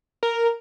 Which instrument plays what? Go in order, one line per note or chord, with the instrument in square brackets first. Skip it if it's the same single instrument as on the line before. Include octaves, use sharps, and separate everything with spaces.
[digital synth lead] A#4